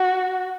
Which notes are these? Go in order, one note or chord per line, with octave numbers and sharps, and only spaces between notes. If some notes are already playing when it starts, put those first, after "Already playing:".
Already playing: F#4